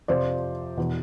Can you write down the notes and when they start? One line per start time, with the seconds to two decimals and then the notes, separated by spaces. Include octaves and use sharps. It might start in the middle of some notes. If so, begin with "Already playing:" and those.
0.08 F2 C3 F3 C5 D5
0.77 E2 B2